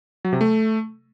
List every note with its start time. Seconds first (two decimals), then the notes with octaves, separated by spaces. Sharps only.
0.25 F#3
0.33 C3
0.41 A3